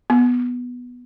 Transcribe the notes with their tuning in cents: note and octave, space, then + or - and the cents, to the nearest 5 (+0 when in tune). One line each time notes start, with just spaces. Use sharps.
B3 -5